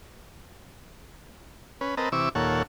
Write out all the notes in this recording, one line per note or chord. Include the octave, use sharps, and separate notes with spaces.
C#4 B4
C4 A#4 B4 D#5 A5
C3 E3 C#6 D6 E6
D#2 A#2 A4 C#5 F#5